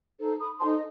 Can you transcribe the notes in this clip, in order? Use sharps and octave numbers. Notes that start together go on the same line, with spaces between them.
D#4 A4 C5
B5 D#6
D#4 A4 C5 A5 C6
D#5